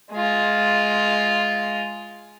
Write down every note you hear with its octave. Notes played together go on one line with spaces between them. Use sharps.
G#3 F4